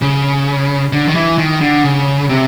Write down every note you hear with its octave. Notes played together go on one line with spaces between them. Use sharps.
C#3
D3
D#3
E3
D#3
D3
C#3
C3